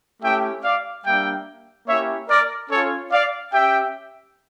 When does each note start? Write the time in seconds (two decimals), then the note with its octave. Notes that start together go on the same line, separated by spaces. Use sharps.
0.23 A3 C#4 E4 G4 E5 G5
0.64 D5 F5
1.06 G3 A#3 D4 E5 G5
1.87 A#3 C#4 E4 G4 C#5 E5
2.29 A#4 D5
2.70 C#4 F4 A4 C#5
3.12 D5 F5
3.53 C#4 G4 E5 G5